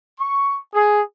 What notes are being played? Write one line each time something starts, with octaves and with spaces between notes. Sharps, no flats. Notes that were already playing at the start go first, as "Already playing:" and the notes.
C#6
G#4